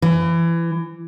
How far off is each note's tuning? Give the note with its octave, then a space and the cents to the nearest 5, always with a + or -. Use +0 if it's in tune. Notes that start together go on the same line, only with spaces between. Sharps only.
E3 +25